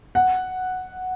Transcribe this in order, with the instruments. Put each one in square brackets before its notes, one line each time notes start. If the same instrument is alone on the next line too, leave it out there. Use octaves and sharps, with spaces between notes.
[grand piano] F#5